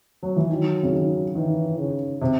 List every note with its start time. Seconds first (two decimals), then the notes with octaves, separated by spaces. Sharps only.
0.23 F#3
0.36 E3
0.50 D#3 F#3
0.83 C#3
0.92 D#3
1.35 D#3 E3
1.78 C#3
2.21 C3